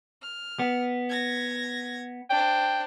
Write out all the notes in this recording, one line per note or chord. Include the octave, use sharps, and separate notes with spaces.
F6
B3
G#6 A#6
D4 C5 G5